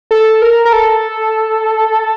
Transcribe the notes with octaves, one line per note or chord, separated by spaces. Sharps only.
A4
A#4
A#4
A4